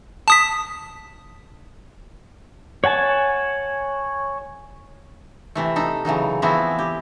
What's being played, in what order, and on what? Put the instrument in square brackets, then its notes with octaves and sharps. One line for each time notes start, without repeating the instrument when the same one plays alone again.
[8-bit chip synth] A5 D#6 B6
[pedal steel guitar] C#5 F#5 G#5 A5
[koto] C3 E3 A3
D#4 A4
C#3 E3 F#3 D#4
E3 F3 B3 C4 E4 F#4
G4